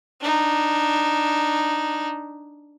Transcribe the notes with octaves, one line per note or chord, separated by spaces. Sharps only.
D4 D#4